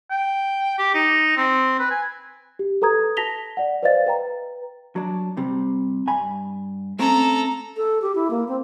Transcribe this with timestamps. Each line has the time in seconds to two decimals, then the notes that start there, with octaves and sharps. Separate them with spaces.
0.10 G5
0.78 G4
0.94 D#4
1.37 C4
1.79 B4
1.90 G#5
2.59 G4
2.82 A4 B4 A#5 D#6 G#6
3.17 A5 A#6 B6 F7 G7
3.57 D5 F#5
3.83 B4 C5 D5 D#5 F5 A6
4.07 B4 G5 A#5
4.96 F#3 D4
5.37 C3 G3
6.07 G2 G#5 B5
6.99 A3 C4 C#4 A4 A#5
7.77 A4
8.02 G4
8.15 E4
8.31 A#3
8.48 C4